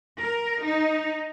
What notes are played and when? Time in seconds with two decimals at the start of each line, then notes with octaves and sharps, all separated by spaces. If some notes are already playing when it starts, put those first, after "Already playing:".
0.22 A#4
0.65 D#4